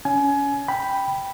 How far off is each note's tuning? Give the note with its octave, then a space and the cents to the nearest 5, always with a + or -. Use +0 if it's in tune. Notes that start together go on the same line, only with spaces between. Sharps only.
C#4 +25 G#5 +25
G5 +0 B5 +0